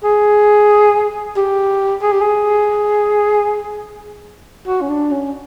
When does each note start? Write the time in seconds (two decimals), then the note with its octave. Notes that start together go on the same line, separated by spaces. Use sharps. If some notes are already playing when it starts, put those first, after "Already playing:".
0.04 G#4
1.36 G4
2.02 G#4
2.12 G4
2.21 G#4
4.67 F#4
4.81 C#4
4.89 D4
5.11 C#4